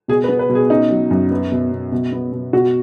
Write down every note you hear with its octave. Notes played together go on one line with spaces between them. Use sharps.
B2 G#4
B4
B3
B4
B2
G#4
C#4 D#4
F#3
F#2
B3
B2
B2
B2
B3
B2
B2 F#4